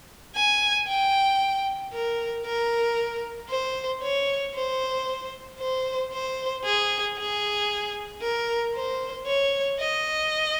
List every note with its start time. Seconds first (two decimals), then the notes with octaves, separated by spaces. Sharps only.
0.36 G#5
0.87 G5
1.93 A#4
2.45 A#4
3.49 C5
4.02 C#5
4.54 C5
5.59 C5
6.13 C5
6.64 G#4
7.17 G#4
8.22 A#4
8.75 C5
9.26 C#5
9.79 D#5